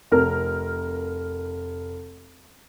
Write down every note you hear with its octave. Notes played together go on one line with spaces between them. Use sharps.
F1 A#4 F6